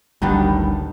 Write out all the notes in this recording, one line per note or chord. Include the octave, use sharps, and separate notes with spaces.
G#1 D2 D#3 G3 B3 D4